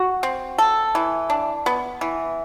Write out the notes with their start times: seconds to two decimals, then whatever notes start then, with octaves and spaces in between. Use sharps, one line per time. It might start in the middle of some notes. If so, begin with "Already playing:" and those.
Already playing: F#4
0.23 C4
0.58 A4
0.95 E3
1.30 D4
1.66 B3
2.01 E3